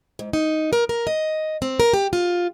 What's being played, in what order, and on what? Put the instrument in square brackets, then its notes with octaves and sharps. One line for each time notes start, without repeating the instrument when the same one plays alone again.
[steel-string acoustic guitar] G#2
D#4
A#4
A#4
D#5
C4
A#4
G4
F4